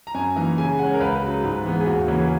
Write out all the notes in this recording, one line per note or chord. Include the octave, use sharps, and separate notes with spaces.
A#5
F#2 G#5
E3 A#3 D#4 A#5
C#3 G#5
G#3 C#4 F#5
A#4
C#2 B4
C#3 F#3
G#2
E3 G#3 B3
G#4
D#2 F#4
C#3 E3 A#3 C#4
G#4